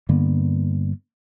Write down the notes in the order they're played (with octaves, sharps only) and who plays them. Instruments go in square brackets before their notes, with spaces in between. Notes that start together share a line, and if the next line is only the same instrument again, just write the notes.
[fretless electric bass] G2 D3 A#3 B3